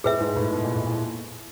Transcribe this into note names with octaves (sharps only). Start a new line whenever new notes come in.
A2 G#4 B4 E5
G#2
A2
B2
A#2
A2
A#2